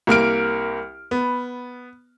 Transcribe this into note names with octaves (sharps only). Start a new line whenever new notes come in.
C2 A#3 F6 D7
B3